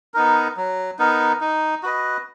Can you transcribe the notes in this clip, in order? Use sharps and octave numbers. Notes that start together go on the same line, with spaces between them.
B3 D#4 A#4
F#3
B3 D#4 A#4
D#4
F#4 B4 D#5